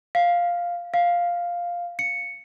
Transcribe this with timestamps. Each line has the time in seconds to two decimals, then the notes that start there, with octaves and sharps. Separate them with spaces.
0.15 F5
0.94 F5
1.99 C#7